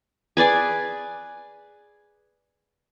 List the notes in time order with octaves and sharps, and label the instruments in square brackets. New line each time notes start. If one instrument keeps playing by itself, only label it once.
[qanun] G#4 B4 D5 G#5